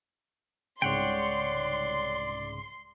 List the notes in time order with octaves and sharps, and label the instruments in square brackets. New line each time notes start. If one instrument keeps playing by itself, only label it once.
[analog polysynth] C2 G#2 C#3 [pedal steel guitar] C#5 F#5 G5 [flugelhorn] D5 [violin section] C6